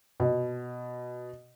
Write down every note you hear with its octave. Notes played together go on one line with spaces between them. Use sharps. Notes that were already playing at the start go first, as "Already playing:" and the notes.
B2